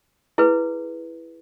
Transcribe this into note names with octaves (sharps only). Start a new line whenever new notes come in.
E4 G#4 B4